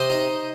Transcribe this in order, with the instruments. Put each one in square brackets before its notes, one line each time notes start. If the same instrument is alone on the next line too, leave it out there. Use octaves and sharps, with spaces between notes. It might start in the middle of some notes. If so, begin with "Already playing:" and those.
Already playing: [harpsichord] C3 C5 D#5
D#4